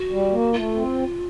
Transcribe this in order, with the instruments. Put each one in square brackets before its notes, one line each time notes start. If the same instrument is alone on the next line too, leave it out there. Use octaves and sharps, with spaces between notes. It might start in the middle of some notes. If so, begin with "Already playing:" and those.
Already playing: [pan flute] F#4
[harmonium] G3
A#3
[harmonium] A3 [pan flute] F4
[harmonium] C4